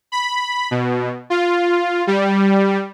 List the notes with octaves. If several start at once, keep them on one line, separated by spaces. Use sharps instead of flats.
B5
B2
F4
G3